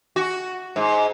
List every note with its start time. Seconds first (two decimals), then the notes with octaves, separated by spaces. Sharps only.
0.16 F#4
0.76 G#2